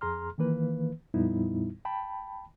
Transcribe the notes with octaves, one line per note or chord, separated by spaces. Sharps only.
F2 G#4 A#5 C6 F6
D#3 E3 A#3 B4
F2 A#2 G3 B3 D#4 E4
G5 A5 B5